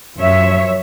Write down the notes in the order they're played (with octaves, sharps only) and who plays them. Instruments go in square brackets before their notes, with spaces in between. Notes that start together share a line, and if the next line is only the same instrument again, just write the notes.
[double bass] F#2 [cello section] F3 C#5 E5